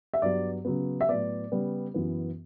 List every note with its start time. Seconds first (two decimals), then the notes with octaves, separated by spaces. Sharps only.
0.13 E5
0.22 G2 F#3 B3 D5
0.65 C#3 F#3 B3
1.01 E5
1.09 A2 F#3 B3 D5
1.51 C#3 G3 B3
1.94 F#2 E3 B3